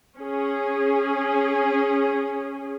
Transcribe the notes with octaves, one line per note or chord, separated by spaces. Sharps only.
C#4 G#4